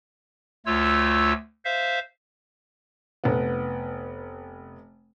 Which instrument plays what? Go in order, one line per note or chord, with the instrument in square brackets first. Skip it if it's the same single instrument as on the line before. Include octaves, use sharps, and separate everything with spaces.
[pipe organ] D2 A3 F4 C#5 E6
C5 E5 F5
[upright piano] F1 B3